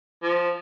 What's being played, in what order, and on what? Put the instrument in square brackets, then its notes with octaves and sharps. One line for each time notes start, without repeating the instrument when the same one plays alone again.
[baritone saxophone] F3